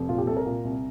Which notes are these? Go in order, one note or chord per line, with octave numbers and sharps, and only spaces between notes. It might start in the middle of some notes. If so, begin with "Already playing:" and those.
Already playing: F1
A#2 F4
G4
C2 A4
A#4
A#2
C2